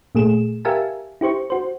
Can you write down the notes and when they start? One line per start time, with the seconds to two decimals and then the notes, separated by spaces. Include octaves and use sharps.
0.15 A#2 A3 G#4 E7
0.65 G4 A#4 E5 F5 G#5 A5
1.21 E4 G4 C5 C#6
1.50 F#4 C5